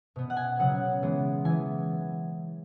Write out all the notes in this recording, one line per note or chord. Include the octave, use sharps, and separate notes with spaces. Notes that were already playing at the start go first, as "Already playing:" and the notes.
B2 B3
F#5
G#5
C#3 F#3 B3 F#5
E3 G#3 B3
E3 B3 G#5